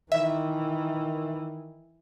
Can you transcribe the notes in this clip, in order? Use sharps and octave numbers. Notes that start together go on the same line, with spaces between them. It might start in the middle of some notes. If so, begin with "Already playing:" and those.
D#3 E3 E5